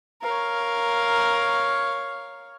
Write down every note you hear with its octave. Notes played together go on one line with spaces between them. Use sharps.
A#4 C#5 F5